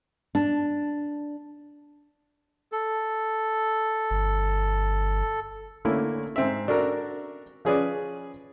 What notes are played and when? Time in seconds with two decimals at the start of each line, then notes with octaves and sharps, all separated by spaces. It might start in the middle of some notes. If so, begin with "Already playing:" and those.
0.35 D4
2.72 A4
4.10 G1
5.85 D3 A3 A#3 C#4 E4
6.36 G#2 C4 E5
6.68 D4 F#4 A4 A#4
7.65 F3 C#4 G#4 B4 D5